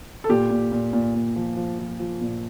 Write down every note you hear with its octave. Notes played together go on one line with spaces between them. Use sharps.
A4
A#2 G4
A#2
A#2
A#2
A#2
F3
F3
F3
F3
A#2